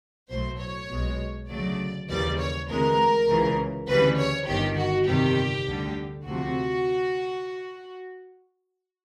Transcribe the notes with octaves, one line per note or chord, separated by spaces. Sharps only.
B1 A2 F#3 A3 C5
C#5
B1 B2 G#3
D2 C#3 F#3 A3 D5
D#2 C#3 E3 G3 D5
C#5
D2 C3 E3 G#3 A#4
C#2 C#3 E3
D2 C#3 E3 G3 B4
C#5
G1 G2 D#3 G4
F#4
G1 F2 C3 D#3 G3 G4
D2 D3 G3
D2 C3 F3 A3 F#4